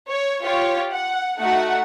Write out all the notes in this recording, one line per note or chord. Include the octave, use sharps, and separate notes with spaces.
C#5
F4 G4 C#5
F#5
A3 D#4 F#4 F#5